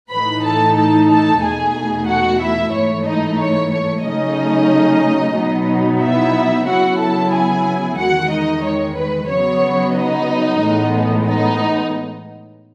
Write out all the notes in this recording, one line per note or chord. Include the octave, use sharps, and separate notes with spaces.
A2 E3 A3 D#4 B4 B5
A4 A5
A4 A5
A4 A5
E2 B2 A3 D#4 G#4 G#5
F#4 F#5
E4 E5
G#2 E3 A3 C#5
D#4 D#5
C#5
C#5
C#3 F#3 A3 C#4 D#4 D#5
B2 F#3 B3 D#4
E4 E5
C#3 F#3 B3 E4 F#4 F#5
A4 A5
G#4 G#5
E2 D#3 G#3 F#4 F#5
D#4 D#5
C#5
B4
C#3 F#3 B3 C#5
D#4 D#5
A2 E3 G#3 B3
D#4 D#5